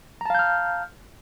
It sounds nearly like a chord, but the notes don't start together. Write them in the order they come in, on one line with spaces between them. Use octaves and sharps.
A#5 A5 F5 G6 F6